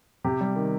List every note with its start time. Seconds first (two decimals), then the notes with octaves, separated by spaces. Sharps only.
0.24 C3 G4
0.41 G3
0.56 D#3